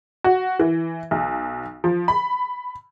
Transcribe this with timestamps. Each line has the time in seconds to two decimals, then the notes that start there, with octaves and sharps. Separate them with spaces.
0.24 F#4
0.59 E3
1.11 B1
1.84 F3
2.08 B5